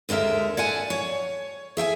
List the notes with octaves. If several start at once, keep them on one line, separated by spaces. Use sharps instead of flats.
D#2 D3 G#3 A#4 E5
D5 F#5 G#5 A5
C#5
G#4 E5 G5 G#5